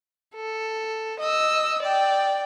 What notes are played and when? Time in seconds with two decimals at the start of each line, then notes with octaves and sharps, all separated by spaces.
0.35 A4
1.20 D#5 E6
1.83 D5 G5